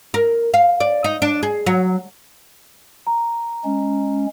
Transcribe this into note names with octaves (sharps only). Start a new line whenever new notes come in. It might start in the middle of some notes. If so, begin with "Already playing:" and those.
A#4
F5
D5
D#4
D4
G#4
F#3
A#5
G#3 C#4